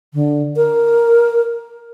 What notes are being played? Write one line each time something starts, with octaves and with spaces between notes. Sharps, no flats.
D3
A#4